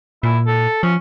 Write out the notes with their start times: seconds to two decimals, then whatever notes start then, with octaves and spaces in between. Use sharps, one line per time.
0.23 A#2 E4
0.47 A4
0.83 F3 C#4